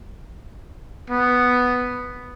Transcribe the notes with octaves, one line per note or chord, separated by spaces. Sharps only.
B3